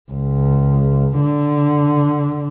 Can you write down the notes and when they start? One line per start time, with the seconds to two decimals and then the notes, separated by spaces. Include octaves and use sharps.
0.11 C#2
1.20 D3